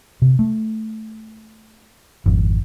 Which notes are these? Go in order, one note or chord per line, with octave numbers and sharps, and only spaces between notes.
C3
A3
G#1 F2